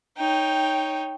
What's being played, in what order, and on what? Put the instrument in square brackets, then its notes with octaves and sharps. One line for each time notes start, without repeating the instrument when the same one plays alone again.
[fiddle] D#4 C#5 [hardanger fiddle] G5